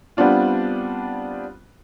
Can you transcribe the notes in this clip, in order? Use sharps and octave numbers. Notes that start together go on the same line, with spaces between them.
G3 B3 C4 D4 F4